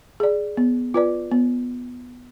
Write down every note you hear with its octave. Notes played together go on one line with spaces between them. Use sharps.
G#4 D5
B3
F4 B4 D5
B3